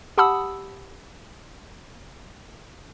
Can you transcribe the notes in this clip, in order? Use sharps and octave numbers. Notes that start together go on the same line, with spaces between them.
G4 F#5 A5 B5 D#6 E6